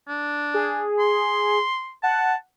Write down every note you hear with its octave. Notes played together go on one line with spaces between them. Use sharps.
D4
G#4
C6
F#5 A5